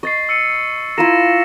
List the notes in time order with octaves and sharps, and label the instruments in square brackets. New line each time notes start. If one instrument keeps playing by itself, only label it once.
[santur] D#5 [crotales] C#6 A6 C7
[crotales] E6 C#7 D#7
[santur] E4 F4 A#4 [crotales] A#6 D#7 E7